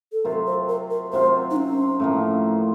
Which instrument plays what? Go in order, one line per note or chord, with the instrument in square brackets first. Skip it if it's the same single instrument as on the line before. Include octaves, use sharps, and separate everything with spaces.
[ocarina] A4
[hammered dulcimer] C3 F#3 C4 F4 [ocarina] A#4
[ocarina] C5
A#4
A#4
[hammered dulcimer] C3 F#3 C4 F4 [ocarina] C5
[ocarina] D#4
C#4
[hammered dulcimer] A2 F3 A#3